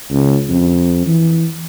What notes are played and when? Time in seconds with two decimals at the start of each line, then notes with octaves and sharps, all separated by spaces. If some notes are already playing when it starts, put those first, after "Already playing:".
0.11 C#2
0.49 F2
1.06 E3